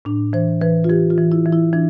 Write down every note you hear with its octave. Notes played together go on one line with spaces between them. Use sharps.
A2 D4
E3 C5
E3 B4
F4
E3 G4
F4
E3
E4
E3
E4
E3 D4